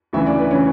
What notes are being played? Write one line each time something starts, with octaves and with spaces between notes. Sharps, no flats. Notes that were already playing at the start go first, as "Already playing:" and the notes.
D2 C#3 E3 E5
D5
B4
C#3 E3 C#5